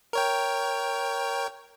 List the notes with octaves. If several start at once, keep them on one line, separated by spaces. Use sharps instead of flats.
A#4 C#5 G5